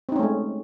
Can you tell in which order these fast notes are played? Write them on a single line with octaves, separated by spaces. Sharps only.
C4 D#4 C#4 A3 G#3